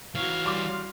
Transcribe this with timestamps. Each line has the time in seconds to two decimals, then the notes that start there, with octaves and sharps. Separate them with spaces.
0.15 E3 F#4 C#5 F5
0.45 G3 C6 D6